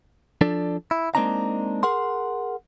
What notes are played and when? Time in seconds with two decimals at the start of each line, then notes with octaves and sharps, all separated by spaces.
0.41 F3 D4 A4 D5
0.91 E4
1.15 G#3 A#3 C4 D4 D#4 A#5
1.83 G#4 A#4 F#5 C6